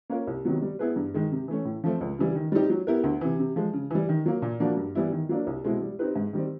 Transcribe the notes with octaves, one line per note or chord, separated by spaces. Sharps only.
A#3 C#4 F4 A#4
C2
C3 D#3 F#3 B3
G3
B3 E4 G#4 B4
G2
D#3 G#3
C3
E3 A3 C#4
A2
F3 A3 C4
C#2
C#3 E3 G3
D#3
G3 C4 D#4 G4
F#3
B3 E4 G4 A#4
D2
C3 E3
C3
F3 G#3
C#3
E3 G3
D#3
F#3 A#3
A#2
F3 A#3 D4 F#4
G2
E3 G3 B3 E4
D#3
F#3 A#3 D4
C2
B2 G#3 C4 E4
G3
C4 D#4 G4 B4
G#2
D#3 G3 C4